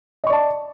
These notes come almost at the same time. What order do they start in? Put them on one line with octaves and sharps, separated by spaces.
D#5 C#6 D5 A5